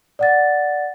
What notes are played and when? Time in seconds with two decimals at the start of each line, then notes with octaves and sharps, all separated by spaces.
0.19 D5 F#5 A6